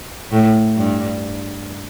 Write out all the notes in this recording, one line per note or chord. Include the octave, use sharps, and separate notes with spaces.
A2
G2